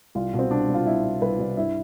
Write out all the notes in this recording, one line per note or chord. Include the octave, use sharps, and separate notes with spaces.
C2 F4
B2
C4
C2 D4
C2
F4
C2 E4
B2
C2 B4
C2
G2 E4